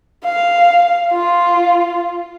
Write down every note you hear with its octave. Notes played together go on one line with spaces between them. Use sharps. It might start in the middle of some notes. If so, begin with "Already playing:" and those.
F5
F4